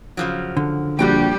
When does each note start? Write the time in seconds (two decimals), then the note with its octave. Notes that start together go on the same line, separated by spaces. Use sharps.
0.17 C#3 F3 F#3
0.57 D3
0.99 A#1 G3 D4 F#4 G4 G5